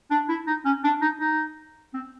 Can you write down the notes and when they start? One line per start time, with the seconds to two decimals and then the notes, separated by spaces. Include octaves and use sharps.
0.11 D4
0.29 E4
0.47 D#4
0.65 C#4
0.84 D4
1.02 D#4
1.20 D#4
1.94 C4